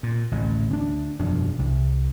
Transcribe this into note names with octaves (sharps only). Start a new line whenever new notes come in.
A#2
A1 D2 A2
D2 C4 D4
E1 F#2 F3 D4
C2